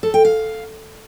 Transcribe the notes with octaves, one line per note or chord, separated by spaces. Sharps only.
A4
G5
F5